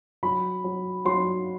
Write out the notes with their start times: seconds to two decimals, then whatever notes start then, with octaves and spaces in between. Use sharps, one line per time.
0.23 F#3 B5
0.64 F#3
1.05 F#3 C6